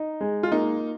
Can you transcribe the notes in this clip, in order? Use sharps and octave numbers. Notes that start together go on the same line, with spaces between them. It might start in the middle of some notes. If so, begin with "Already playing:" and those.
Already playing: D#4
G#3
F4
A#3 D#4